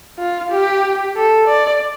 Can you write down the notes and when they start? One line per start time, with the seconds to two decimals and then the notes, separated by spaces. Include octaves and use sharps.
0.18 F4
0.51 G4
1.16 A4
1.48 D5